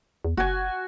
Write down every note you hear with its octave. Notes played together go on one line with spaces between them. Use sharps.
E2
F#1 F#4 G#5